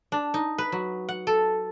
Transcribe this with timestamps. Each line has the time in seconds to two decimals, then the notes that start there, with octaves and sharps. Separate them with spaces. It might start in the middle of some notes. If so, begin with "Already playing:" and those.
0.12 D4
0.34 D#4
0.58 B4
0.72 F#3
1.09 F#5
1.27 A4